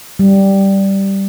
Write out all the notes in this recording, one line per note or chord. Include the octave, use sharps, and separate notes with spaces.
G3